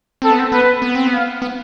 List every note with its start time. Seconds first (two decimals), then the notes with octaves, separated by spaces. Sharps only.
0.22 C4 A4
0.31 B3
0.39 C4
0.52 B3 B4
0.82 B3
0.95 C4
1.07 B3
1.12 F5
1.42 B3